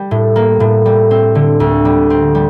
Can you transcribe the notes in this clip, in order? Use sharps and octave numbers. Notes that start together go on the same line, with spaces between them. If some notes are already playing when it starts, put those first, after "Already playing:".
Already playing: G3
A2
A#3
A2
G3
C4
D3
D2
G3
C4
G3